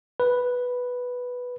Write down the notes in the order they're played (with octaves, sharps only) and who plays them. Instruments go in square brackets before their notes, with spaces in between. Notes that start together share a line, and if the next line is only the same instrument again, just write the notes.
[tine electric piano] B4